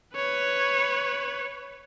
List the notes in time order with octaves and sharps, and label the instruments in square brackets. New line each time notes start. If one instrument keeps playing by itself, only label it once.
[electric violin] B4 C#5